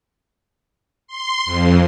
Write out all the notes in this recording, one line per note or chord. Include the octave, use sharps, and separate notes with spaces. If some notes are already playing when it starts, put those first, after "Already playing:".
C6
F2